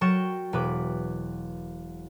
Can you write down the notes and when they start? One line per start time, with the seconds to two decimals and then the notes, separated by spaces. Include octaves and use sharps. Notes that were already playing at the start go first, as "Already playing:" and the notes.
0.01 F#3 A#4 G5 C#6 A6 E7
0.53 E1 B4 D6